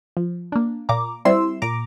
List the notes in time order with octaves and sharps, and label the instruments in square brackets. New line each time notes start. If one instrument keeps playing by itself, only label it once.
[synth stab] F3
A#3 D4
A#2 A#5 D6
G3 C4 E4 C6 E6
A#2 A#5 D6